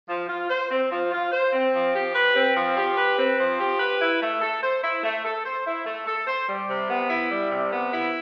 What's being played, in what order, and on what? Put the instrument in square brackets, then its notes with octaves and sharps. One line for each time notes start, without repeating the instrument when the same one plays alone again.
[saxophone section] F3
F4
C5
C4
F3
F4
C5
C4
F3
G4
B4
C4
F3
G4
B4
C4
F3
G4
B4
E4
A3
A4
C5
E4
A3
A4
C5
E4
A3
A4
C5
G3
C3
B3
E4
G3
C3
B3
E4